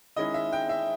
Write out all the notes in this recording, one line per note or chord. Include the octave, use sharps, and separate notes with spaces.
D#3 G#3 C#4 E4 D#5
E5
G5
E5